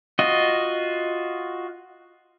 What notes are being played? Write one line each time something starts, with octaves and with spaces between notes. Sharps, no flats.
F4 F#4 D#5